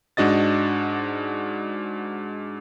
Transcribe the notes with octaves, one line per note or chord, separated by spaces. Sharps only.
G#2 D4 F#4 D#5 A6